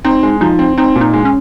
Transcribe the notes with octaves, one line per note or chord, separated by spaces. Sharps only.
C4 D#4
G#3
F3 D#4
C4
C4 D#4
A#2
D#4
G#3
C#4